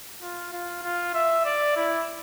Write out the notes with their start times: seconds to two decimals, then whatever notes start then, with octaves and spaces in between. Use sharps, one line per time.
0.22 F4
0.53 F4
0.83 F4
1.14 E5
1.45 D5
1.76 E4